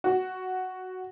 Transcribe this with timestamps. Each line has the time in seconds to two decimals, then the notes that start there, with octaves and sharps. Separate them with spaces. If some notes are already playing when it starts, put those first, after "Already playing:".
0.04 F#4